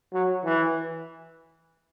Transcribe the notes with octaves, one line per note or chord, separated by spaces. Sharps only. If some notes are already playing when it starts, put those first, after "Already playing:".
F#3
E3